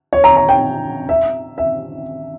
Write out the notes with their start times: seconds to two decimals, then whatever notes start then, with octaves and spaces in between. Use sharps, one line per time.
0.13 C#5
0.24 A#5
0.37 A#5
0.49 G5
1.09 E5
1.58 E5